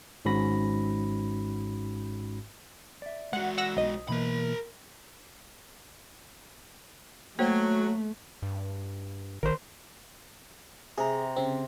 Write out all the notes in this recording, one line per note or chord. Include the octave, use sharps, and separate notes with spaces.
G#1 G#2 C#4 F#4 B5 A#6
D5 E5
G#3 F#4 F#5
F#5 E6 A#6
B1 D#5
B2 E3 A#3 A#4 B5
F#3 A3 A#3 C5
G2
A1 D#3 A#4 C5
C3 G#4 A#5
C#3 C4